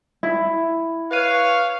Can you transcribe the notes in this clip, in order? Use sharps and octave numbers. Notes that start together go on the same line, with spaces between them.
E4
B4 C#5 F5 F#6 D#7